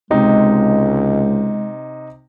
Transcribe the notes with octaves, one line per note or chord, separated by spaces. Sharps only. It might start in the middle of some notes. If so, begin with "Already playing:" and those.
C#2 C3 G#3 D#4